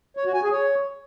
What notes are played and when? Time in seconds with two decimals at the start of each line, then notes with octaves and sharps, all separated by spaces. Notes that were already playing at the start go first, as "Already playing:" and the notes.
0.17 C#5
0.26 F#4
0.34 G#5
0.43 G#4
0.52 C#5